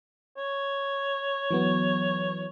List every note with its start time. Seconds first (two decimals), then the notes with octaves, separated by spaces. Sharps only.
0.37 C#5
1.51 E3 F#3 B3